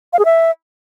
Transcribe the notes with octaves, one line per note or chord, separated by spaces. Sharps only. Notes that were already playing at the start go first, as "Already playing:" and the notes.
F5
G#4
E5